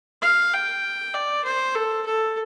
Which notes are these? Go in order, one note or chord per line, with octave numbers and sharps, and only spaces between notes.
F5
G5
D5
C5
A4
A4